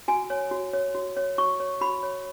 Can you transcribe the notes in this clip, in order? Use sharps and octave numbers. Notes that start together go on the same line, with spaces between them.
F#4 G#5
C#5
F#4
C#5
F#4
C#5
F#4 C#6
C#5
F#4 B5
C#5